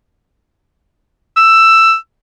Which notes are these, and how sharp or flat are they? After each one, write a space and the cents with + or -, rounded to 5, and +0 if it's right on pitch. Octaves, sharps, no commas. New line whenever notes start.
E6 +10